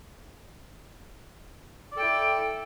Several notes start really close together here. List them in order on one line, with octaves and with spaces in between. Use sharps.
D5 A4 G5 E4